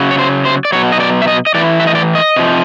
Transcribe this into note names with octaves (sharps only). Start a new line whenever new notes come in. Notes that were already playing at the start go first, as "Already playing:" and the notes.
Already playing: C#3 F#3
C#5
C5
C5
D5
B2 F#3 C#5
D#5
D5
E5
D#5
D#5
A2 E3 D5
E5
D#5
D5
D#5
C3 F3